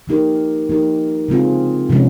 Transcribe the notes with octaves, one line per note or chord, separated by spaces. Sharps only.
F3 A#3 D#4 G4 A#4
F3 A#3 D#4 G4 A#4
C#3 G#3 C4 F4 G#4
C3 F3 G#3 C#4